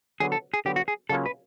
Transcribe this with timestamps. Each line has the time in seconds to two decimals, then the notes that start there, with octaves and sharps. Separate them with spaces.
0.20 D3 F#3 B3 G#4
0.32 A4
0.54 G#4
0.65 D3 F#3 B3 G4
0.76 F#4
0.88 G#4
1.09 C#3 F#3 A#3 C#4 F4 A4
1.26 B4